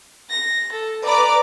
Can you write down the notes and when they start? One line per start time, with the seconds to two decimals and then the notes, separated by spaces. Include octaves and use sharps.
0.29 A#6
0.72 A4
1.05 B4 D5 A#5 D6